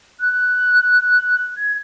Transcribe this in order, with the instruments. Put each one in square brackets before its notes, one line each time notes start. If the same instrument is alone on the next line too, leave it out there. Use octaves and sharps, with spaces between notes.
[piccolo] F#6
G#6